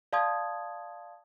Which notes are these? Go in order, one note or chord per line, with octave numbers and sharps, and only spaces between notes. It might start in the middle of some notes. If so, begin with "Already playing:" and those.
D5 F5 A5 C6 D#6 G#6